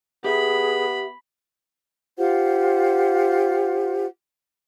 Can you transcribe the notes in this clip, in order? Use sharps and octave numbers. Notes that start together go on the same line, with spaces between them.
B3 G4 G#4 E5 B5
F4 G4 C5 F#5